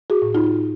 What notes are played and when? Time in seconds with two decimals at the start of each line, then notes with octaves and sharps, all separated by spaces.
0.10 F#4 G#4
0.22 A2
0.34 D#4 F4